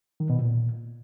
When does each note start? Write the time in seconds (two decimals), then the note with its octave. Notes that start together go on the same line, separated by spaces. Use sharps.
0.20 D#3
0.30 B2
0.39 A#2